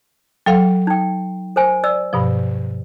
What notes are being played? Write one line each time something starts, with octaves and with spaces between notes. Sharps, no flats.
F#3 A4 F5 G5
D#4 G5
A#4 C5 G#5
D5 E6
G2 B2 F3